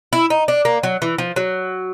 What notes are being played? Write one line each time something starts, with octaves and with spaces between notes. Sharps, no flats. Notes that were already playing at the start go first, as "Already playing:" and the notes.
E4
D#4
D4
A#3
F#3
E3
F3
F#3